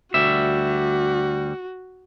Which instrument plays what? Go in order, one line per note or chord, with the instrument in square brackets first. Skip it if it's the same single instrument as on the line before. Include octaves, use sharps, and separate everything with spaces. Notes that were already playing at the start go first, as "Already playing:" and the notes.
[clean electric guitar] D2 G3 E5 [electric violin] F#4